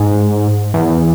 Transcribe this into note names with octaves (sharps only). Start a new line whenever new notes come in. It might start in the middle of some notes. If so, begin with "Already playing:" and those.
Already playing: G#2
E2